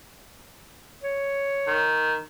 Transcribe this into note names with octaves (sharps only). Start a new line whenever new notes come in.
C#5
D#3